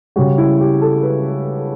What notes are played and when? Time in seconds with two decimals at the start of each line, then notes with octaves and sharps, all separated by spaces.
0.16 C#3 G3 F#4
0.38 E4
0.60 G4
0.82 A4
1.03 B4